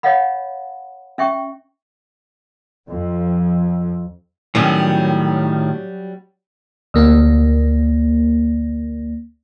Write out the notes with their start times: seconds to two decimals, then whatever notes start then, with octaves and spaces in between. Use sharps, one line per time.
0.03 C#5 D#5 F5 F#5 B5
1.18 C#4 E5 G5 C#6
2.89 F2
4.55 A2 D#3 F#3 G3 C#4
6.94 D2 A#3